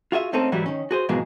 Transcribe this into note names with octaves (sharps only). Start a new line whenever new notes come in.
F4 F#4 G#4 E5
A3 A#3 C4 C#4 D#4 A4
G#2 E3 F#3 G3 E4 F#4
D#3 C#4
F#4 G#4 C5
F2 G#2 B2 E3 G#3 A#3